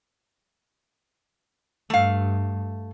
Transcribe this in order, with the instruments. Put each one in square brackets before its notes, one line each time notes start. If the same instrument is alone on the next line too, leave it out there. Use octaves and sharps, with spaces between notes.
[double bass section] G2 [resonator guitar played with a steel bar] A3 F5